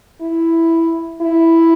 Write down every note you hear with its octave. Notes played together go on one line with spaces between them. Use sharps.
E4
E4